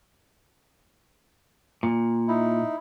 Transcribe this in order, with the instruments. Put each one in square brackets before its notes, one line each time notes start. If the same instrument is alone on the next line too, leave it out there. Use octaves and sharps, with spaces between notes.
[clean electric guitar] A#2
[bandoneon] D#4 E4